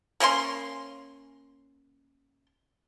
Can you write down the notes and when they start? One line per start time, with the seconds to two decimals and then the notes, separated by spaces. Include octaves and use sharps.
0.20 A#3 C#4 A#4 C6